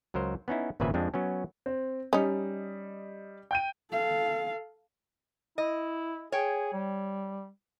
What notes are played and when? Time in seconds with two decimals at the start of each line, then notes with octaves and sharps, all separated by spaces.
0.14 C#2 F#3 A#4 C5
0.48 B3 C#4 D#4 E4
0.80 G#1 A#2 C#3 B4 E5 G#5
0.94 F2 G#3 C4 D4
1.14 F#3 B3 C#4
1.66 C4
2.13 G3 C#4 D#4 D#5
3.51 G5 G6 D#7
3.91 A4 F5
5.58 E4 D#5
6.32 G#4 C#5 G5
6.73 G3